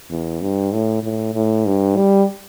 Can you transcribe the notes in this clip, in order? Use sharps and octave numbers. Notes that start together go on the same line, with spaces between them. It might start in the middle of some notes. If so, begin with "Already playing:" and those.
E2
G2
A2
A2
A2
G2
G3